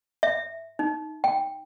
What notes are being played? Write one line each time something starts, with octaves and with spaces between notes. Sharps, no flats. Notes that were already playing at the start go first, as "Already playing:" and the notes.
E5
D#4
G5